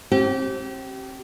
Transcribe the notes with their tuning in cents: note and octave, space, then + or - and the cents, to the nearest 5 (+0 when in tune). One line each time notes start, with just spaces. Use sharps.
C4 +35 G4 -30